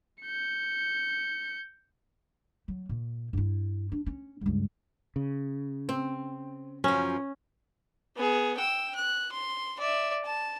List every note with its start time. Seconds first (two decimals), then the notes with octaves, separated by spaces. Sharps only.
0.23 G6 C#7
2.68 F#3
2.89 A#2
3.33 G2 E4
3.92 D4
4.06 C#4
4.41 C#2 G2
5.16 C#3
5.89 C4
6.84 F#2 F3 C#4
8.16 B3 G#4
8.57 G5 E6
8.95 F#6
9.32 C6
9.79 D5 E5
10.24 A5